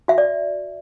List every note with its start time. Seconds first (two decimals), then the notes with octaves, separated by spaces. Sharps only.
0.08 F#4 E5
0.18 D5